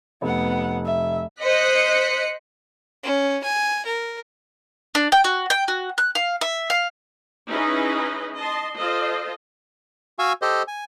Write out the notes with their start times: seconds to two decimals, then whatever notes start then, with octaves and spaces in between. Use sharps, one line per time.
0.22 F1 B3 F#5
0.85 E5
1.42 C5 D#5 F#6 B6 C#7
3.04 C#4
3.44 G#5
3.86 A#4
4.95 D4
5.12 G5
5.24 F#4
5.50 G5
5.68 F#4
5.98 F#6
6.15 F5
6.41 E5
6.70 F5
7.49 C#4 D#4 E4 G#4 B4 D#5
8.36 D#5 A5 C6
8.76 F4 A4 C5 D#5
10.19 F#4 F5 G#5 C#6 E6
10.42 G4 A4 C5 D#5
10.68 G#5